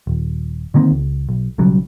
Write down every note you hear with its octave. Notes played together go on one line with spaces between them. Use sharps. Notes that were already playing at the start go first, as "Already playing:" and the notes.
D#1
D3 D#3 A#3 C4
C#2
B1
B1 C#3 F#3 G3